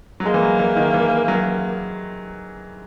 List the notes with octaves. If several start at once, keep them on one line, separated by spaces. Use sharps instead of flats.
F#3
G#3 A#3
E3
F#3
E3
D#3
E3
F#3